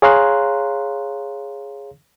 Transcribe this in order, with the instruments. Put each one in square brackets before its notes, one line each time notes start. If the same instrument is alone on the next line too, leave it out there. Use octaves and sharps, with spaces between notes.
[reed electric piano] G#4 C#5 F5 A#5 C6 F#6